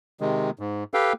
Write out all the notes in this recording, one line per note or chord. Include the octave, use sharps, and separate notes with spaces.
C3 D#3 G#3
G#2
G4 A4 B4 F5 G5